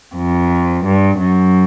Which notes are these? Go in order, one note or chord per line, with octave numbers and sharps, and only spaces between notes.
F2
G2
F#2